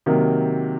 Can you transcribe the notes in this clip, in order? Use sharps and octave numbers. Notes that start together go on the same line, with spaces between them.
C3 D#3 F#3 A#3